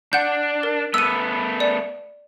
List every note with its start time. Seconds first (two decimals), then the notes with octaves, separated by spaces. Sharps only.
0.13 D4 F#5 G6
0.63 A#4
0.94 A3 B3 B4 E6 D#7
1.60 D5